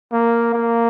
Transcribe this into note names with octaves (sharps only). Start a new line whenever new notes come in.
A#3
A#3